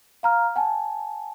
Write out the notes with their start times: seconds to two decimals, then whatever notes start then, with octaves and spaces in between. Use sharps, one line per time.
0.23 F5 A#5 F6
0.56 F#5 G#5 A5